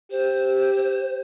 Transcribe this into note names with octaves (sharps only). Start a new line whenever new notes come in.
G4 C5